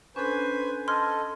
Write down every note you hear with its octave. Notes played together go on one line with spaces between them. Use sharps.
C#4 D4 A4 B4 C5 G#5
A4 D#5 C6 F6 G#6